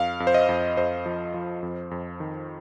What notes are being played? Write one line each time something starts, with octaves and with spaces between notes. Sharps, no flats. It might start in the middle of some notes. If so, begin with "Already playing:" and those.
Already playing: F2 F5
F2
C5
D#5
F2
F2 C5
F3
F3
F2
F2
D#3